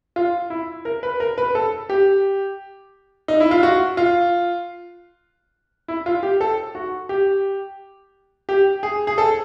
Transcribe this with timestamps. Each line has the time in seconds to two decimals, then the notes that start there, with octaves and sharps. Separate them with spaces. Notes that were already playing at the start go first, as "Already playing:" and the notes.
0.16 F4
0.50 E4
0.85 A#4
1.03 B4
1.20 A#4
1.38 B4
1.55 A4
1.89 G4
3.28 D#4
3.40 E4
3.51 F4
3.63 F#4
3.97 F4
5.88 E4
6.06 F4
6.23 G4
6.41 A4
6.75 F#4
7.09 G4
8.49 G4
8.83 G#4
9.07 G#4
9.18 A4